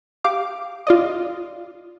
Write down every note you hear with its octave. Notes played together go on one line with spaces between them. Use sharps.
G4 F5 D6
F4 D5 D#5